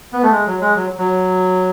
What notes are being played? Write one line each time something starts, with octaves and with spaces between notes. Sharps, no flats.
B3
A3
G#3
F#3
G#3
F#3
F#3